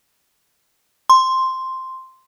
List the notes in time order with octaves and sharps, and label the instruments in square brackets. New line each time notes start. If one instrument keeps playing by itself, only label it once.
[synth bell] C6